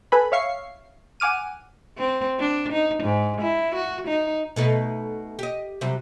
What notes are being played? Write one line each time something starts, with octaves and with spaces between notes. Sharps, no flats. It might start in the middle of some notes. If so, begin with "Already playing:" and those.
A4 B4 G#5 B5
C#5 E5 F5 C#6 C7
F#5 G#5 D6 F6 D#7
C4
D4
D#4
G#2
E4
F#4
D#4
B2 A3 D#4
G4 D#5
C3 F#3 G3